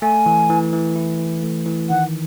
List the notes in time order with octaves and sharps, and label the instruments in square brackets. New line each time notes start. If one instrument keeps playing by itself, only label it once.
[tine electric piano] A3 [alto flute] G#5
[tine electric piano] E3
E3
E3
E4
E3
A3
E3
[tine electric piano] D#3 [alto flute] F#5